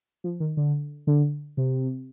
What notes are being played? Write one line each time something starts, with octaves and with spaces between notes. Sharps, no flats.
F3
D#3
D3
D3
C3